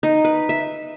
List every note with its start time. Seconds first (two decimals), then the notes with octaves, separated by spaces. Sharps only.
0.03 D#4
0.24 B4
0.49 E5